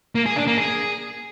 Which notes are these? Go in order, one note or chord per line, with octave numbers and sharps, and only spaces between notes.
A#3
G#4
D4
A#3
G#4